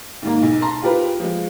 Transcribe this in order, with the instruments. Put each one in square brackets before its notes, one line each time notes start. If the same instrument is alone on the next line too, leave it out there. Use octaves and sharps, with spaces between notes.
[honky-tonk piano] D#2 G#2 A#3
B1
A5 A#5 C6
F4 G4 A#4 B4
F3 G#3